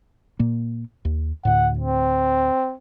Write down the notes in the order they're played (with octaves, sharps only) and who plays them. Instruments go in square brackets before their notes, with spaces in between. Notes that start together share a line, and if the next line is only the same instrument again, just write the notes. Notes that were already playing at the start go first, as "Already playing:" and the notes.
[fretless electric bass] A#2 A#3
D#2
[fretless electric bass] D2 A2 [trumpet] F#5
[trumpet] C4